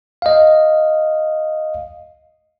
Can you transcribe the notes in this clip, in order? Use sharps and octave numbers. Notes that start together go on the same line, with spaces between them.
D#5 F5